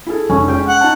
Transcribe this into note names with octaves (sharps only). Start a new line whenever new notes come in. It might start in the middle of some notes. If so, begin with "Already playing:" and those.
E4 G#4 A4
F1 C#4
G#3 C#4 G5
F#5
D#4 A5